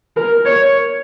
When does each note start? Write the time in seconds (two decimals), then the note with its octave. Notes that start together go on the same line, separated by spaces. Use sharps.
0.17 A#4
0.46 C#5